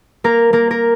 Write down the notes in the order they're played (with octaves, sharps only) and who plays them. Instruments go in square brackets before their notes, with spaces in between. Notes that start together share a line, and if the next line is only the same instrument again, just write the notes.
[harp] A#3 A#4
A#3 A#4
A#4